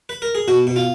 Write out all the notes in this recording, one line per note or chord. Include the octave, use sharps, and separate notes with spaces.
B4
A#4
G#4
B2 F#4
B2
F4